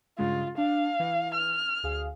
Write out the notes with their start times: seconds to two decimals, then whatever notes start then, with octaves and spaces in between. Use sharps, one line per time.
0.18 G2 C#3 G#3 F4
0.58 D4 F5
1.00 E3
1.34 F6
1.83 D2 G#4 F5